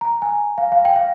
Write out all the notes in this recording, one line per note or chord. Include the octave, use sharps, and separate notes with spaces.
A#5
G#5
F5
F5
G5
F5